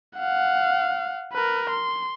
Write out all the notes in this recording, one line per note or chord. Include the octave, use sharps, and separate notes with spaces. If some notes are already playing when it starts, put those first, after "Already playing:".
F5 F#5
A#4 B4
C6